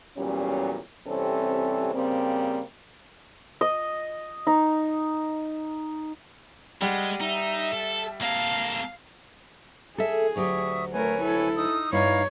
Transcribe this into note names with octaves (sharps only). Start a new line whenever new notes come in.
E2 A#2 F#3 G3 C#4
C3 E3 G3 C4 C#4 A4
C#3 G3 A#3 C4
D#5
D#4
G3 G#3 F#5
D#4 E5
A4
A#3 A4 F5
G#4 A4 E5
D2 F#3 G4 E5 C#6 D#6
A3 A#4 B4 C#5 G#5
E4 A4
D#4 D#6 E6
G2 D#4 E4 C#5 F5 A#5